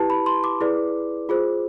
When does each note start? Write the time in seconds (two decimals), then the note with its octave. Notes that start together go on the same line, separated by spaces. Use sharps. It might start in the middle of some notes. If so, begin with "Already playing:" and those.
Already playing: E4 G4 B4 A5
0.10 B5
0.26 C6
0.44 D6
0.61 E4 G#4 B4 D5
1.29 F4 G#4 C5